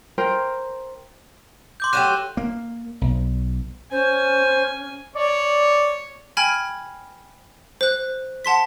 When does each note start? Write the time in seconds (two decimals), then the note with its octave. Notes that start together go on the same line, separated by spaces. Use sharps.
0.18 A#4 C5 G5
1.80 C6 D6 G6
1.93 F#3 A3 G4 F#6 D#7 E7
2.37 A#3
3.01 B1
3.92 C#4 C5 G#5
5.16 C#5 D5
6.37 G5 G#5 B5 F6 G#6
7.81 C5 F#6
8.45 F#5 A5 C6 B6